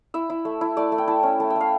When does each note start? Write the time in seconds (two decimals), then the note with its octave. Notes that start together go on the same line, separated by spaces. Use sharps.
0.14 E4 E5
0.30 E4
0.45 A3
0.61 E4
0.77 A3 D5
0.92 A3
0.98 G5
1.08 E4 A5
1.23 C#4
1.40 A3 A5
1.50 G5
1.56 A3 F5